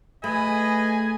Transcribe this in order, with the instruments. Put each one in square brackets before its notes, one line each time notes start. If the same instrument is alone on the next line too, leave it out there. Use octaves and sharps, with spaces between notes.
[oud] A3 [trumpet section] G#4 B4 D#5 [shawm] G#5 [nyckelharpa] B5